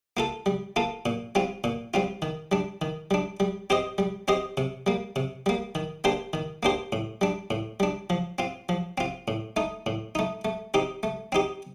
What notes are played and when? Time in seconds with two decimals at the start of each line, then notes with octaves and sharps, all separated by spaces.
0.17 A#3 F4 A4
0.46 G3
0.76 A#3 F4 A4
1.06 A#2
1.35 G3 C4 F4
1.64 A#2
1.94 G3 C4 F4
2.22 D#3
2.52 G3 D4
2.82 D#3
3.11 G3 D4
3.40 G3
3.70 C4 G4 C5 D#5
3.98 G3
4.28 C4 G4 C5 D#5
4.57 C3
4.87 G3 A#3
5.16 C3
5.46 G3 A#3
5.75 D#3
6.04 A#3 D4 G4 C5
6.33 D#3
6.63 A#3 D4 G4 C5
6.92 A2
7.21 G3 D4
7.51 A2
7.80 G3 D4
8.10 F3
8.39 C4 F4
8.69 F3
8.98 C4 F4
9.28 A2
9.56 A3 D#4
9.86 A2
10.15 A3 D#4
10.45 A3
10.74 C4 D#4 G4
11.03 A3
11.32 C4 D#4 G4